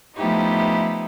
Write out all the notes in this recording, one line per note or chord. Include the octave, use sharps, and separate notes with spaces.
F3 A3 B3 D#4 E4 G4